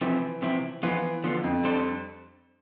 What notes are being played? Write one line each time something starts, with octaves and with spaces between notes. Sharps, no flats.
C3 E3 F3 C4 E4
C3 F3 C4 E4
E3 F3 B3 F4
D3 F3 B3 F4
F2
G3 D4 A4 C5